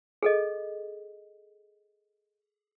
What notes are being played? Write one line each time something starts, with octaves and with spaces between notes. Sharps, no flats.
G#4 A4 D#5